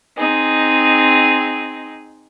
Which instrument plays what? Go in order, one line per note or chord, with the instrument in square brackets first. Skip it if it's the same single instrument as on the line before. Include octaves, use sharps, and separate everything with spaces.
[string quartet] C4 D#4 G#4